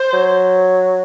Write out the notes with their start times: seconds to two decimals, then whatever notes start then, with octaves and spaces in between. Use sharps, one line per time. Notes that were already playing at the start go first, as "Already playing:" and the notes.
Already playing: C5
0.13 F#3